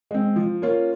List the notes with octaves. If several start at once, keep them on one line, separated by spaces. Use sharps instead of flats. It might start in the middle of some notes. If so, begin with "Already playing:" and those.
G#3 C4
F3
A#3 C#4 F4